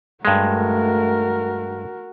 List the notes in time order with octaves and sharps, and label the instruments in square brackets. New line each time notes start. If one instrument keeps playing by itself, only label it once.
[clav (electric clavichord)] G2 G#3 [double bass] A3 [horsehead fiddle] F#4 A#4